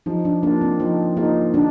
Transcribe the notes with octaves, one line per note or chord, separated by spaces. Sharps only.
F3 D#4
D4
A#3 D4 F4
C4
F3 D#4
A#3 D#4 F4
D3 D4